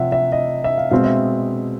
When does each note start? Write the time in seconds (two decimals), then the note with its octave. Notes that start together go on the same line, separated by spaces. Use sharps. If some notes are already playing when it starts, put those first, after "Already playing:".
Already playing: C3 F3 E5 F#5
0.12 E5
0.32 D#5
0.64 E5
0.78 F5
0.91 B2 G#3 C4 F5
1.04 E5